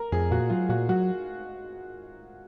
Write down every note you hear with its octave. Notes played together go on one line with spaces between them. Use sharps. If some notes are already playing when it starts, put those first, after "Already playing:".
Already playing: A#4
F2 G#4
A#2 F#4
F#3 F4
A#2 F#4
F#3 F#4